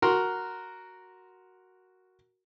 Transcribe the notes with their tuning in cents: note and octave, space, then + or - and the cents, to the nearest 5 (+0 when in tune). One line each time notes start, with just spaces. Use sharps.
F#4 +0 A#4 +0 C6 +0